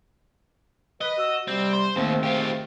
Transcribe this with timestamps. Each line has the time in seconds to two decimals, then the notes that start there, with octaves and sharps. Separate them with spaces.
1.01 B4 D#5
1.18 F#4 E6
1.48 C3 G3 C4
1.73 C5
1.96 D#2 G#2 D#3 A3 C4
2.23 F4 G4